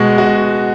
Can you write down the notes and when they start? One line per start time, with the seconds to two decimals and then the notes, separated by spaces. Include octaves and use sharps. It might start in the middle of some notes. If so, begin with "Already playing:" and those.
Already playing: B2 G#3 F#4
0.18 F#4